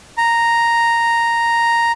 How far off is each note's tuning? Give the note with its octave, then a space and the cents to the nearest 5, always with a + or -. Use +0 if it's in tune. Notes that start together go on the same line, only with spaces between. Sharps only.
A#5 +0